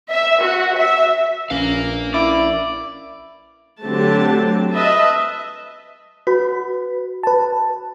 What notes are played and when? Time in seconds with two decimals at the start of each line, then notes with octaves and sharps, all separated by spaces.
0.10 E5
0.42 F#4
0.77 E5
1.50 A#1 C#4 A#4 B4 F5
2.14 E4 D5
3.84 D3 F#3 A3 C4 G4 A5
4.73 B4 D#5 E5 A5
6.27 F#4 B4
7.23 B4 A5